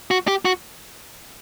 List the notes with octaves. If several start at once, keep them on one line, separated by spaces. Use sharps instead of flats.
F#4
G4
F#4